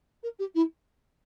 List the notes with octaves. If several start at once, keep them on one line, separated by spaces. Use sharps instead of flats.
A#4
G4
E4